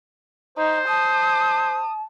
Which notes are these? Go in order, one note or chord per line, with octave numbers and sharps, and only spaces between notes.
D#4 C5
A5 D#6